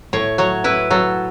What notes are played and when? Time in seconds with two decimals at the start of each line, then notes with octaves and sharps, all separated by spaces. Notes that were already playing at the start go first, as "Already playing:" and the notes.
0.13 A2 C#5
0.38 F#3 C#5
0.64 E4 B4
0.90 F#3 A4